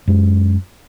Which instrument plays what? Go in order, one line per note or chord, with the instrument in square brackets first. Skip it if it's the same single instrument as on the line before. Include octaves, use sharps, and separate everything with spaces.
[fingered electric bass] F#2 G#3